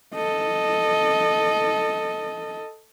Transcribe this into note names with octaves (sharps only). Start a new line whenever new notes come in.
A4 D#5